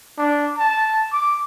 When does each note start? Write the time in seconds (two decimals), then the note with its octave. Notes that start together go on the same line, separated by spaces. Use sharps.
0.18 D4
0.57 A5
1.12 D6